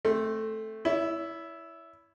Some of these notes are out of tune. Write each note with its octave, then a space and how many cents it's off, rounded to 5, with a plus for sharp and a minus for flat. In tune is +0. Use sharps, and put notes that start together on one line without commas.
A3 +0 C4 +15
E4 +0 C#5 +40